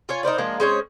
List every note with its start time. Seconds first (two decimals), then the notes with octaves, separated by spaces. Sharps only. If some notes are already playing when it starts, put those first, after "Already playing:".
0.09 F4 C#5 G#5
0.23 D#4 A#4 C5 D5
0.38 F3 G#3 A#3 D4
0.60 G#3 C4 C#4 C#5